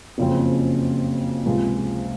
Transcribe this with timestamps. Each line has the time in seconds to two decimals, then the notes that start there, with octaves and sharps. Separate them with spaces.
0.18 F#1 F2 C#3 F3 C4
1.46 C#2 C3 F3 G#3